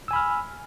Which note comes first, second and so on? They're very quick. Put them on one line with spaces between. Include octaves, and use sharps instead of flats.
E6 G#5 B5 F6